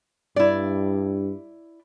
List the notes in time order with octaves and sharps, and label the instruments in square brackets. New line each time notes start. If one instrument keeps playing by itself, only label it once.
[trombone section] G2 [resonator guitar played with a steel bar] E4 D5